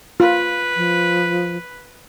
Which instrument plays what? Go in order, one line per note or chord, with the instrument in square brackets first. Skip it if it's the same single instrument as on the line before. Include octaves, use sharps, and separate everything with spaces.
[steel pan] F4 [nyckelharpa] B4
[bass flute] F3